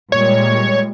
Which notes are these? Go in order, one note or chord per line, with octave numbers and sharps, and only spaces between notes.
A#2 G3 G#3 C#5